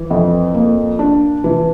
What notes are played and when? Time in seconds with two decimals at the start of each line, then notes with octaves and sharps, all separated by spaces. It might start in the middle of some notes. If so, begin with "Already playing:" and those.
Already playing: E3
0.10 F2
0.54 A#3
0.99 D4
1.44 E3